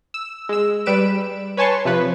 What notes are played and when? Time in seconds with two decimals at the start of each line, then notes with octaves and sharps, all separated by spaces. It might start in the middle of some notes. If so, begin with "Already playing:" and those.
0.14 E6
0.49 G#3 E6
0.86 G3 B4 D7 E7
1.57 B4 C#5 G#5 A5 C6 C#6
1.85 C3 F3 B4